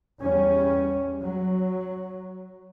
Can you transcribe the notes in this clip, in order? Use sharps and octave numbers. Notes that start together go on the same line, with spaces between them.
E2 G3 C#4
F#3